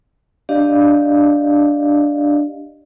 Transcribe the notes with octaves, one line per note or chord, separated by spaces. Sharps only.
D4 G4 D5 D#5 F5